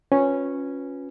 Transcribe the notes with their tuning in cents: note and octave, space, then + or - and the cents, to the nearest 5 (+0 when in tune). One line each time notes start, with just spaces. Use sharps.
C#4 -5 F4 +30 B4 +0